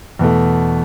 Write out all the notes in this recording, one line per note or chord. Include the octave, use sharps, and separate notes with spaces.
E2 B2 A3